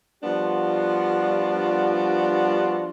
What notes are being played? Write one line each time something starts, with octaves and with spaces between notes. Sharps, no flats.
F3 G3 B3 D4 F4 F#4